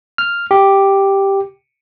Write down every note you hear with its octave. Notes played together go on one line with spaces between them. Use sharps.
F6
G4